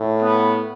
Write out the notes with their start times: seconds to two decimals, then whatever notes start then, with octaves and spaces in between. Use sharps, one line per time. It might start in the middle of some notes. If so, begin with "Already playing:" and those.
Already playing: A2
0.22 B3